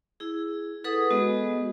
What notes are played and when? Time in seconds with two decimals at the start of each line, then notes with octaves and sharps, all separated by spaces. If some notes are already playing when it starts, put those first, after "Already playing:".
0.20 E4 G#4
0.84 G#4 A4 B4 F#5 D#6
1.10 G#3 B3 F#4 D#5